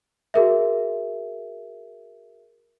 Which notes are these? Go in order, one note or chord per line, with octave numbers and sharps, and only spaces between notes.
F#4 G#4 A#4 E5